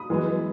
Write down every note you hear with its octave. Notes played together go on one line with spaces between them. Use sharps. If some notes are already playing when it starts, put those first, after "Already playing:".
Already playing: B5 D#6
F#2 E3 G#3 B3